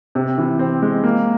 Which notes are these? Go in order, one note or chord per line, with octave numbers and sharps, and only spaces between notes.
C3
E3
C4
G#3
A#3